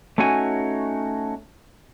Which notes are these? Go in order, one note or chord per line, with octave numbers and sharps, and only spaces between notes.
A3 C#4 D#4 F#4 G#5